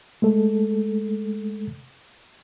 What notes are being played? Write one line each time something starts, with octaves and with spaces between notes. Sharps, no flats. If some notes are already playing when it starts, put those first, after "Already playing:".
G#3 A3 A4